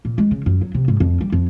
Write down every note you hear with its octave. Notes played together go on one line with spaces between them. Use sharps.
A#2
G#3
C#3
F#2
F#3
C3
G#2
F2
G3
F2